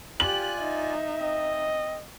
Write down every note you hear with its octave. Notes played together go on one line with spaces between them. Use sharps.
F4 G4 D5 G#5 F#6 F#7
D#4 E5
C4 D#5